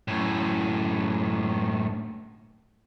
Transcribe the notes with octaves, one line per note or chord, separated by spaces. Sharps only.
F#2 A2